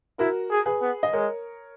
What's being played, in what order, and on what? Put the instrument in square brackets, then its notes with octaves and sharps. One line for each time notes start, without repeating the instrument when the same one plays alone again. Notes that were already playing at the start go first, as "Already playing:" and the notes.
[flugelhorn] E4 [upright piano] F#4 A#4
[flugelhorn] G#4
[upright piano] G#4 B4
[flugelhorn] B3
[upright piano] D#5
[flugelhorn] G#3 [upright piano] A#4 C#5